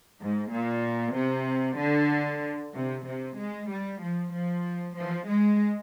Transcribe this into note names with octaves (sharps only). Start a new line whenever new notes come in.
G#2
A#2
C3
D3
C3
C3
G#3
G3
F3
F3
F3
G#3